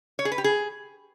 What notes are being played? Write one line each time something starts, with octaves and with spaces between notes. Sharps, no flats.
C#5
G#4
B4
G4
G#4